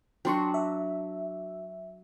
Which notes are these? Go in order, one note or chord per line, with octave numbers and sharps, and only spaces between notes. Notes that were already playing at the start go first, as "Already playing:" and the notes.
F#3 D4 F#4 G5 C6 C#6
E5